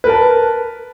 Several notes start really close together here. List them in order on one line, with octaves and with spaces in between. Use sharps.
B4 A#4 A5